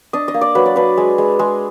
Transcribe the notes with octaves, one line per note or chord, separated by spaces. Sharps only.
D4 D#5
D#5
A#3
D5
F#3 B4
D5
D4 B4
G#3
G#3
G#3